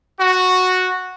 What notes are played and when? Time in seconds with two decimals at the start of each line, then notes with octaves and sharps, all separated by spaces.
0.20 F#4